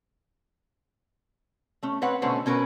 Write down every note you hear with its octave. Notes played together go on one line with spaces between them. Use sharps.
A3 C#4
C4 B4 C#5 F#5
B2 D3 A3 C#4 B4 C5
B2 C#4 A#4 B4